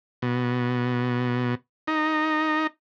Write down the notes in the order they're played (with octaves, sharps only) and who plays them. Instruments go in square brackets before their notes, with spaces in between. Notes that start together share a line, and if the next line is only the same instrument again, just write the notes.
[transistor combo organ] B2
D#4